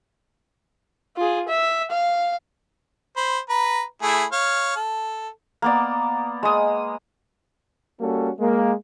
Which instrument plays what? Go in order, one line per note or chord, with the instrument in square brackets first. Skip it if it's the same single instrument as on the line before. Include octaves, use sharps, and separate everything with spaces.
[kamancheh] F4 G#4
E5
F5
[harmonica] C5 B5
B4 A#5
A3 E4 G#4
C#5 F5
A4
[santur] A#3 B3 D5
G#3 D#6
[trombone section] G3 A#3 C#4 F#4 A4
G#3 A#3